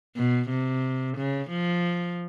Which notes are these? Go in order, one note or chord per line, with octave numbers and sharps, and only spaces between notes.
B2
C3
C#3
F3